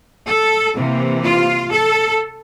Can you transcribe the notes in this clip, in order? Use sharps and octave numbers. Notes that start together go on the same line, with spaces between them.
A4
C3 E3 A#3
F4
A4